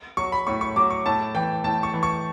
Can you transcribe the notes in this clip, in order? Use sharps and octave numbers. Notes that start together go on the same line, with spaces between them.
F#3 C#6
B5
A2 C#6
C#6
F#3 D6
C#6
A2 A5
E3 G5
A2 A5
C#6
E3
C#6